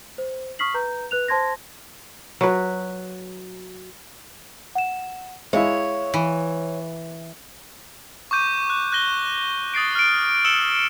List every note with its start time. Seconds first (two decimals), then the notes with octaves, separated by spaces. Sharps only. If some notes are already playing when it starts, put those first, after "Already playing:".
0.18 C5
0.59 C#6 D#6 F6 B6 C7 F#7
0.74 B4 A#5 G6
1.11 B4 F#6 F7
1.28 C5 A5 C6 G#6 A#6
2.41 F#3 B4
4.75 F#5 E7
5.53 G#3 E4 C#5 E5 F5
6.14 E3
8.31 C#6 D6 G6 D#7
8.70 F#6
8.92 F#6 G6 A#6 G7
9.74 D#6 A6 C7 D7
9.95 F6 D7
10.45 E6 C#7 E7 F#7 G7